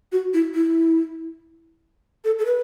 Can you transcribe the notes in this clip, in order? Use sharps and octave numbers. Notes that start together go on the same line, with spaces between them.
F#4
E4
E4
A4
A4
B4